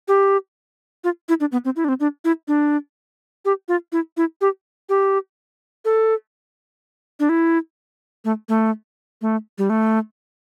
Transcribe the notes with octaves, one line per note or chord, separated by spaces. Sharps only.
G4
F4
E4
D4
B3
C4
E4
D4
C4
D4
E4
D4
G4
F4
E4
E4
G4
G4
A4
D4
E4
A3
A3
A3
G3
A3